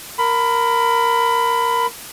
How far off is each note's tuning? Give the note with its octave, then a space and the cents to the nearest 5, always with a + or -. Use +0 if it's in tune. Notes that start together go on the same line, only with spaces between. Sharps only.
A#4 +0 B5 +20